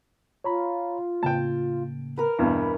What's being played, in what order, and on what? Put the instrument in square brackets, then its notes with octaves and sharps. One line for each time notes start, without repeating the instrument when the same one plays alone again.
[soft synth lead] F4 [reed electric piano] C#5 A#5 B5
[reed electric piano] A2 C#3 A#3 [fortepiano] G5 A5
[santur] A#4 B4 [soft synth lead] F6
[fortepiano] E2 G2 B2 [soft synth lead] B5